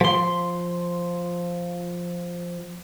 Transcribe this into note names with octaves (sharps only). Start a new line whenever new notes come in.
F3 C6